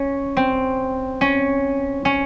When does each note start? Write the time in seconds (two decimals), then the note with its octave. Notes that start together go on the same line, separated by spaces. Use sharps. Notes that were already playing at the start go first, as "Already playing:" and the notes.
Already playing: C#4
0.37 C4
1.21 C#4
2.05 C#4